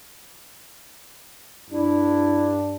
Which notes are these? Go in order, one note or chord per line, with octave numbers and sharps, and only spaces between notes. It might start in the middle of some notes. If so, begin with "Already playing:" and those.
G2 D4 E4